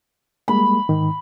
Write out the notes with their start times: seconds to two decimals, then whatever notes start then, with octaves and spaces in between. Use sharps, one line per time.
0.48 G3 G#3 A#3 B5
0.89 G#2 D#3